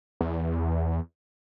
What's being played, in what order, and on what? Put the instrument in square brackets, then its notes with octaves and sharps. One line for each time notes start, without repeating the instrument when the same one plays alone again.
[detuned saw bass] E2